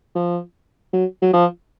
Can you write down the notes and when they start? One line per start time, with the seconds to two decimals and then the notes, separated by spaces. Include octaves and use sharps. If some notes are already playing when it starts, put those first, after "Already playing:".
0.15 F3
0.93 F#3
1.22 F#3
1.33 F3